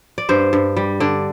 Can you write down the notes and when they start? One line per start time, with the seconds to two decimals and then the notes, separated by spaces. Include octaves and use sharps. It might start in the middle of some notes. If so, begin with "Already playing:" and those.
0.18 D5
0.29 G2 C5
0.53 G2
0.77 G3
1.00 D3 D5